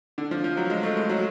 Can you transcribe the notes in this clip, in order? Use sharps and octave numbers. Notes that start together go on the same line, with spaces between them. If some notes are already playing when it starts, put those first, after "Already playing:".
D3
F3
F3
F#3
G#3
A3
G#3
F#3